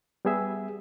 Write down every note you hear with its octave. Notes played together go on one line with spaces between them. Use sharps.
G3 B3 G#4 E5